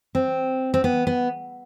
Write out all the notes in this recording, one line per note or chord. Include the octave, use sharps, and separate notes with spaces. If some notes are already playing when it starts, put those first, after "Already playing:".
C4
C4
B3
B3